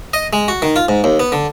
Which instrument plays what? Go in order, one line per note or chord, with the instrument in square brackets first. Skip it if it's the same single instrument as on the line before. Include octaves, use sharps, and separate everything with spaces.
[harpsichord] D#5
G#3
F#4
D#3
F4
G#2
D#2
B3
D3